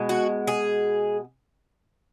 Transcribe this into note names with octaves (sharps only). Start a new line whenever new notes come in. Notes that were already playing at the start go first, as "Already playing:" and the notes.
Already playing: B2 G#3
F#4
G#4